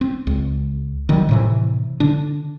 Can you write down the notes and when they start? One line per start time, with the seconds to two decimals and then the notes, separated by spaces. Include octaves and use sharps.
0.01 C4
0.27 C#2
1.09 D#3 F#3 G3
1.29 A2 C3 E3
2.00 D3 D4